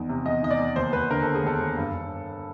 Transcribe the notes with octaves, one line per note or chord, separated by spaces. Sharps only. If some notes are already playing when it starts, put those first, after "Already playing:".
Already playing: E2 D#3
C3
E2 D#5
D#3 D#5
D5
E2
D#2 C5
D#2 B4
D3 A#4
A4
D3
G#4
D#2 A4
D#2
G2
G2